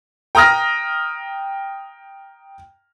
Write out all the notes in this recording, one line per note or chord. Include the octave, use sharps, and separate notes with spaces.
G5 A#5 D#6 F6 A#6